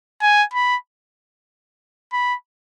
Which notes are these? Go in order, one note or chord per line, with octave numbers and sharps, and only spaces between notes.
G#5
B5
B5